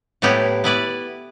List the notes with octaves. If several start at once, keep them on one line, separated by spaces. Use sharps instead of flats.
A2 F#3 B3 E4 G4
B3 E4 B4 D5